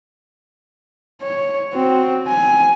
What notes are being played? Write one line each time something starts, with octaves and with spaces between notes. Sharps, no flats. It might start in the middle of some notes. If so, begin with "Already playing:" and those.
C#5
C4 F#4
G#5